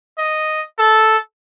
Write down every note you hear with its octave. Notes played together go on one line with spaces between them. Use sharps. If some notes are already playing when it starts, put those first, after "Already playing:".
D#5
A4